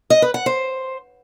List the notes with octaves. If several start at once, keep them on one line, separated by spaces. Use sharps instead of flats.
D#5
B4
F#5
C5